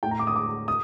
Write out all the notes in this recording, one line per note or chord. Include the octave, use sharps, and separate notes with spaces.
A2 G5
A#5
D6
D#6
D6
D#6